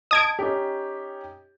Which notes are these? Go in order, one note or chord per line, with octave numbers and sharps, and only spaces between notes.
D#5 A5 D#6 G#6 D7
C#4 D#4 G4